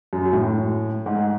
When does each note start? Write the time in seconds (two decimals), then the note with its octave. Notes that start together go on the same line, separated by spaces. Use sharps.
0.13 F#2
0.33 A2
1.06 G#2